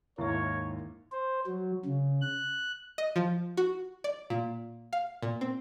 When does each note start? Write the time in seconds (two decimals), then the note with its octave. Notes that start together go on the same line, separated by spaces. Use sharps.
0.18 D#2 G#2 E4 A#4 C#5 E5
1.12 C5
1.47 F#3
1.86 C#3
2.22 F#6
2.98 D#5
3.16 F3
3.57 F#4
4.04 D5
4.30 A#2
4.93 F5
5.22 A#2
5.41 C4